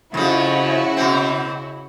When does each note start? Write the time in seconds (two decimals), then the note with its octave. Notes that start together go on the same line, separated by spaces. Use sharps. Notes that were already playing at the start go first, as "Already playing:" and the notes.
0.14 F2 C#3 F3 E4 F#4
0.97 B2 C4